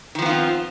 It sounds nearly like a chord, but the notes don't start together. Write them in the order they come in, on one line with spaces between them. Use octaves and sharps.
D#3 F3 B3 F4 C4